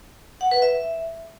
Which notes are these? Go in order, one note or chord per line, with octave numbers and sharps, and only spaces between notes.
F#5
B4
E5